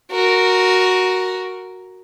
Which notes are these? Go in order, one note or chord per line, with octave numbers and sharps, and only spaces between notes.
F#4 A#4